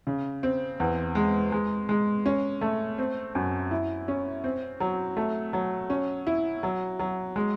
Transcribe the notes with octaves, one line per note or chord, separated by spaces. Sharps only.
C#3
C4
E2
G#3
G#3
G#3
C#4
A3
C4
F#2
E4
C#4
C4
F#3
A3
F#3
C#4
E4
F#3
F#3
G#3